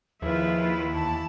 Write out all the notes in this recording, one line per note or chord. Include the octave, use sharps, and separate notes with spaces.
D#2 F3 E4 F4 G#4 B4 E5
E2 A5